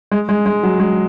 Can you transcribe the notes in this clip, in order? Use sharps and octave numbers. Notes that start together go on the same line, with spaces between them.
G#3
G#3
G#3
F#3
G#3